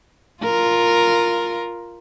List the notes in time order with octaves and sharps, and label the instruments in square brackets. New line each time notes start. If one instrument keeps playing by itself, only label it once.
[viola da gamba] F4 A#4